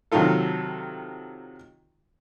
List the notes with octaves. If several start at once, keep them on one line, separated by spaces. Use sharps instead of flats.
C3 D#3 F#3 D#4 F4 A4